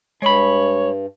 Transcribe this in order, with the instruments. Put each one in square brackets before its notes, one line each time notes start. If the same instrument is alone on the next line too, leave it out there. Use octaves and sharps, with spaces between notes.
[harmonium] G2 [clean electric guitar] G#3 B5 [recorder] C#5